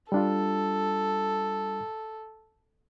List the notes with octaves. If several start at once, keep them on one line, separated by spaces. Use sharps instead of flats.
G3 D4 F4 A4